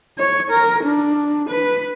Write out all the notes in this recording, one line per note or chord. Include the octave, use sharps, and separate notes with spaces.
C#5
A#4
D4
B4